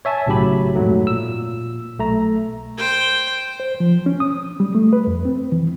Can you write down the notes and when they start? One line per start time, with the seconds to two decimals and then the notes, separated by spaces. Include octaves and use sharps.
0.05 C#5 E5 G#5 A5
0.26 B1 A2 C#3 F#3 G4 B5
0.75 F2 G#2 F#3 A3
1.07 A#2 E6
1.99 B1 A3 A#5
2.77 C5 G5
3.60 C5
3.80 F3
4.06 C#4
4.20 D#6
4.60 G3
4.75 A3
4.93 B4
5.07 F2
5.25 C4
5.52 E3